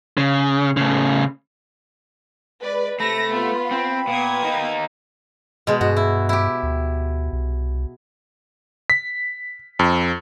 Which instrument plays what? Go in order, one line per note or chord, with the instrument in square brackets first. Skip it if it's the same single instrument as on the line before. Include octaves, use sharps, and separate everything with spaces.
[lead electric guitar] C#3
A2 C#3
[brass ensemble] G#3 [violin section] B4 D5
[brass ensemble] C3 [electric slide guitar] A3 [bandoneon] B5 [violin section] A#6
[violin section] B3 F4
[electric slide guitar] C4 [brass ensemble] G5
[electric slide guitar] A#2 [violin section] B3 D#6 G#6
[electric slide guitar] A#3 D#4
[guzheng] B2 G#3
[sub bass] G2 [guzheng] F#4
[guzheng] E4
E4 G4
[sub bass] D2
C2
[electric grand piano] B6
F2